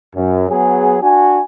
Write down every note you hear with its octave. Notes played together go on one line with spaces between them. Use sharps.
F#2
F#3 B3 G#4
D4 F#4 G#5